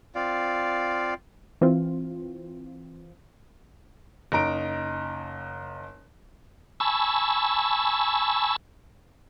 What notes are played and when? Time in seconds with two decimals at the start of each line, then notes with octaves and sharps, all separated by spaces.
0.15 C4 F4 D5 F5
1.61 E3 C4 F4
4.32 F#1 D#4 A#5 D7
6.80 G#5 A5 B5 C#6 E6